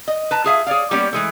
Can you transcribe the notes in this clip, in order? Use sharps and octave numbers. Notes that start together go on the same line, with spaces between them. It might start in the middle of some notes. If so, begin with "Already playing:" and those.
D#5
B4 A5 A#5
F4 G#4 E5 F5
G#4 C#5 D5 F5
G3 A#3 B3 C#4 G4 D5
E3 G#3 A3